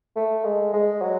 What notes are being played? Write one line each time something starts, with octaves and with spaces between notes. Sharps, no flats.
A3
G#3
G#3
F#3